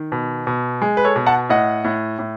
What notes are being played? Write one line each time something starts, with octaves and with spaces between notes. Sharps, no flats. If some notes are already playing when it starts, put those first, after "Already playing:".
Already playing: D#3
B2
B2
G#3
B4
A4 C#5
B2
F#5 A5
A2 D#5 F#5
A2
A2